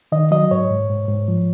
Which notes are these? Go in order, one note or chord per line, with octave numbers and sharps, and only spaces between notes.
D#3 D#5
F#3 D#5
G#2 C#5
G#2
G#2
G#2
F3